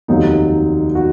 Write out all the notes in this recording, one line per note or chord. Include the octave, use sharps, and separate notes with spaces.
F1 D#2 D#3 F#3 D#4
F#4